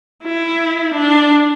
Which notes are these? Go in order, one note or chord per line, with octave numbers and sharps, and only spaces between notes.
E4
D4